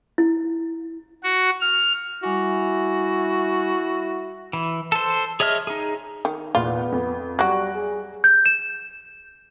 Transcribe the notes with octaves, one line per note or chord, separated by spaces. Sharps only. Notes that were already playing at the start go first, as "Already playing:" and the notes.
E4
F#4
F6
G3 E4 F#4 G#5 D6
E3
A4 C5
G#4 C#5 D#5 E5 F6
D#4 G#4
D#3
E2 A#2 B3 F4 B5
F2
F#3 G3 F#4 F#6 A#6 D7
G#4
G6
E7